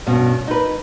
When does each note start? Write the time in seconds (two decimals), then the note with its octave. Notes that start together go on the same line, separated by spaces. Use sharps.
0.07 G2 B2 C#4
0.47 D#4 B4